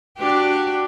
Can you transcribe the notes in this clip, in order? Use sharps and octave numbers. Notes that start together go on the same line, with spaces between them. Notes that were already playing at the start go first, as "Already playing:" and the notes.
D4 F#4 G4